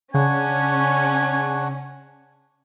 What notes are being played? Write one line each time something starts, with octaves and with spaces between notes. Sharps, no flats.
C#3 C#4 D4 C#5 F#5 G#5